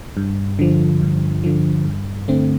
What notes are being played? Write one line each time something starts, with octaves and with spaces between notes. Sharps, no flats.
G2
D3 F3
G2
D3 F3
G2
D3 A3 C4